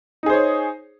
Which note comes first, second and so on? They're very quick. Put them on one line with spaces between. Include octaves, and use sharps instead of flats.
D#4 G#4 C5 C#5